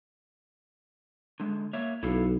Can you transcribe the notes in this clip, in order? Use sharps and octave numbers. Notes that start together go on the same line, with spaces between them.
D3 G#3
A#3 C#5 E5
B1 E4 A4 F5